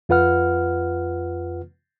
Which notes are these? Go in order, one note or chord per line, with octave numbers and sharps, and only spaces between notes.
F2 F4 B4 F#5 F6